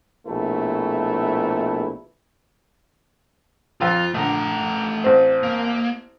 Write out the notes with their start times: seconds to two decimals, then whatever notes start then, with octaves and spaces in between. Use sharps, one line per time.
0.27 A#1 B2 A3 E4 B4
3.81 F2 F4 F5 E6
4.14 A#1 D3 A3 A#5
5.04 A1 C4 C5
5.43 A#3